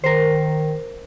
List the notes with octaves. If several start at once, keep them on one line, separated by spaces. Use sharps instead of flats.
D#3 A#4 C5